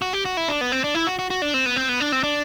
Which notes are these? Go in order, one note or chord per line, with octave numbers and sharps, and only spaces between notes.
F#4
G4
F#4
E4
D4
B3
C4
D4
E4
F#4
F#4
F#4
D4
C4
B3
C4
B3
D4
C4
D4